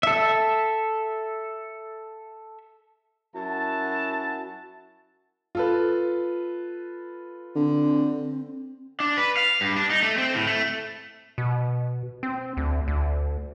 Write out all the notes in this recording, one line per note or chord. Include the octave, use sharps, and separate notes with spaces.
A4 E5
F#2 E4 F#4 A5
F4 A4 B4
D3 C4
D4
B4
F5
G2
D4
D#4
A3
C4
A2
A3
B2
C4
D2
D2